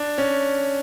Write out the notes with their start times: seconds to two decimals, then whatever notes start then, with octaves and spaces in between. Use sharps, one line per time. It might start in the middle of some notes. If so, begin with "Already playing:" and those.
Already playing: D4
0.18 C#4